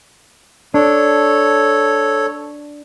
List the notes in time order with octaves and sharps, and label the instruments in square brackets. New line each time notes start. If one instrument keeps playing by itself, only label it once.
[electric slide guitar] D4 [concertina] A4 C#5